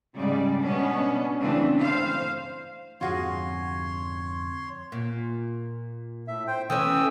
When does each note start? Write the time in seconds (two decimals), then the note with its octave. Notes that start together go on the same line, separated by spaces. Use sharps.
0.15 G#2 C#3 G3 G#3 D5
0.61 B2 B3 C#4 D4
1.39 C#3 E3 A3 C4 D4
1.80 C5 F5
3.01 F2 G#2 D3 F4 F#4 G#4 C#5 C6
4.92 A#2
6.28 A2 E5
6.47 C5 G5
6.70 E3 A3 C#4 G5 D#6 E6